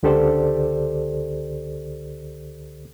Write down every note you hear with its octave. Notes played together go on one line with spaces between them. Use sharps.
C#2 D3 G4 A4 C5 D5